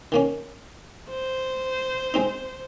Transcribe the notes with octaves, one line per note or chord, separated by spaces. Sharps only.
D#3 A#3 C#4
C5
G#3 C4 D#4